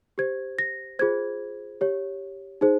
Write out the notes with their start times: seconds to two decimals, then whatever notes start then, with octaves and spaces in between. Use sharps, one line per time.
0.18 G4 C5 G#6
0.59 A#6
0.99 F4 G#4 C5 G#6
1.81 G4 C#5
2.61 D#4 G#4 C5